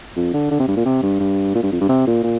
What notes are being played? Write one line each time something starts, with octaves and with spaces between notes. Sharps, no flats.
F2
D3
D3
C3
G2
A#2
C3
G2
G2
A#2
G2
F2
G2
C3
A#2
A#2